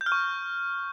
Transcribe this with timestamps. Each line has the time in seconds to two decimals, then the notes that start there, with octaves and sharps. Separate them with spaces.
0.01 G6
0.06 F6
0.12 C#6